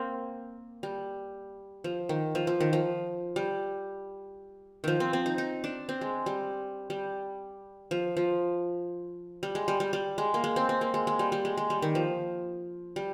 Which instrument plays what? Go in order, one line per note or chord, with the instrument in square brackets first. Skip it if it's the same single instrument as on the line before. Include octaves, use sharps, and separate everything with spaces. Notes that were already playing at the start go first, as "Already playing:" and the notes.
Already playing: [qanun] A#3 C4
G3
F3
D#3
F3
F3
D#3
F3
G3
D#3 F3
C4
C4
D#4
D#4
D4
C4
G#3
G3
G3
F3
F3
G3
G#3
G3
G3
G3
G#3
A#3
G#3
C4
C4
A#3
G#3
G#3
G3
G3
G#3
G#3
G3
D#3
F3
G3